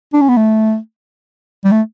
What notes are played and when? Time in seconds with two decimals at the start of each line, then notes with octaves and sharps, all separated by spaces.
0.13 D4
0.21 C#4
0.29 B3
0.37 A3
1.64 G3
1.71 A3